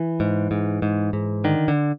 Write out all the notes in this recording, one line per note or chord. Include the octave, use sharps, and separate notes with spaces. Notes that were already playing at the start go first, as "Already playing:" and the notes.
Already playing: E3
G#2
G#2
G#2
G#2
D3 D#3
D3